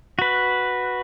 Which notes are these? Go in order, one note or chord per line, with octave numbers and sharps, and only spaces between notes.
F#4 B4